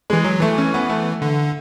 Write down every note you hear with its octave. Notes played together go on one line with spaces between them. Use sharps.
E3 G#3
F#3
E3 A3
C#4
B3
A3
D3